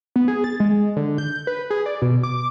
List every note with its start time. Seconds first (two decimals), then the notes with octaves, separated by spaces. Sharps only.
0.16 B3
0.28 G#4
0.44 A6
0.60 G#3
0.96 D3
1.18 G6
1.47 B4
1.70 G#4
1.86 D5
2.02 B2
2.23 D6